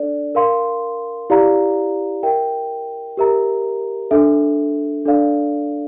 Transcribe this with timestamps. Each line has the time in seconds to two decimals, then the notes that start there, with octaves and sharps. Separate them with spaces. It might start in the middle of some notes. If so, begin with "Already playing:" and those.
Already playing: D4 A4 D5
0.35 A#4 F5 C6
1.30 E4 G4 D5 F5 A#5
2.23 A#4 E5 G5
3.17 G4 A#4 E5 A#5
4.11 D4 A4 E5
5.05 D4 A4 D5 F5